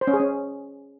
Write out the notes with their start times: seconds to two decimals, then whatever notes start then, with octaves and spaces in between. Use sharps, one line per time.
0.01 C5
0.07 C#4
0.13 G#4
0.20 C#4